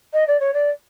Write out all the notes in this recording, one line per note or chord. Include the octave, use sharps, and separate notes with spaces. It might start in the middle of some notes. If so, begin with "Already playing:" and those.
D#5
D5
C#5
D5